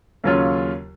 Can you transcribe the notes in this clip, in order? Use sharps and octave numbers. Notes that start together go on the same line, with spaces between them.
D#2 C#3 F#3 C#4 F4